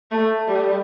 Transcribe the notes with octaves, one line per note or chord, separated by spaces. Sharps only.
A3
G3